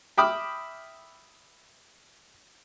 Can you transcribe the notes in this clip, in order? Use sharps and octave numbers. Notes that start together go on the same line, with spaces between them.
E5 G5 B5 D6 D#6 F6